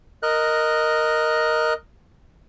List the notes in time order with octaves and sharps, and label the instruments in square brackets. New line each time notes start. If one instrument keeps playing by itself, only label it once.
[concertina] A#4 D#5 F#6